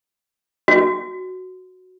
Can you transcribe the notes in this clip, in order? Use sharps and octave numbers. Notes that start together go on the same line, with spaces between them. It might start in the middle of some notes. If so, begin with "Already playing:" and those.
F#4